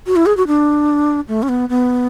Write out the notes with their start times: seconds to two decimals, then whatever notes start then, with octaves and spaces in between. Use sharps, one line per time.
0.07 F#4
0.16 E4
0.26 G#4
0.37 F#4
0.47 D4
1.28 A3
1.43 C#4
1.49 B3
1.69 B3